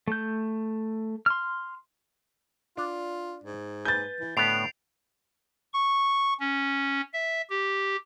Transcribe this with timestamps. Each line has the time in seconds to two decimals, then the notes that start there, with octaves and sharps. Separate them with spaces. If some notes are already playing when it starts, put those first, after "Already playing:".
0.08 A3 G6
1.26 C6 F6
2.77 D4 F4
3.44 G#2
3.85 B4 G#5 G6 A6
4.20 E3
4.37 A2 D3 B3 C7 D7 F7
5.73 C#6
6.40 C#4
7.13 E5
7.50 G4